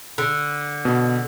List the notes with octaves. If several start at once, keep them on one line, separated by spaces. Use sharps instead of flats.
D3
B2